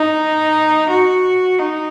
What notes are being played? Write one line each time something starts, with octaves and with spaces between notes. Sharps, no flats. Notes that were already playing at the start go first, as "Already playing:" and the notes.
Already playing: D#4
F#4
D#4